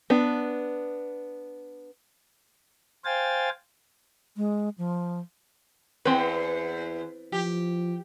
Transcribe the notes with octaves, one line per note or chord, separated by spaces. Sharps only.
B3 D4
C5 F5 G5 G#5 A6
G#3
F3
E2 C4 B4
F3 G4